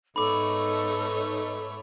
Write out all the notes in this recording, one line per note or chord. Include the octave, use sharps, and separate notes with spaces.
G#2 A3 B3 D#4 A4 C#5 B5 D6